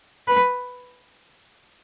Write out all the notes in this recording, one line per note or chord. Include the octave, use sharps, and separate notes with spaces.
B4